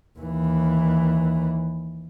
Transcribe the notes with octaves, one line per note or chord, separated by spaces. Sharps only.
D#2 E3